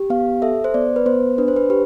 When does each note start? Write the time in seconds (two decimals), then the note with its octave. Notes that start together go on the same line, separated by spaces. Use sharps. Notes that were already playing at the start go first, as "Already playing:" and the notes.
Already playing: G4
0.10 B3 F5
0.42 A4 E5
0.64 C5
0.74 B3 D5
0.96 B4
1.06 B3 C5
1.38 D4 B4
1.48 C5
1.56 B4
1.70 G4 B4